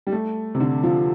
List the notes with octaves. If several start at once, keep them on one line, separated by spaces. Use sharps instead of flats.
G3
A3
C3
D3
F3